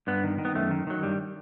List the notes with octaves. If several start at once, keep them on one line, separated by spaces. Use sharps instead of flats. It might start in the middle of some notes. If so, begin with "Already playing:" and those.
G2 B3
D#3
D#3
B3
F#2 A3
D#3
D#3 F#3
G2 G3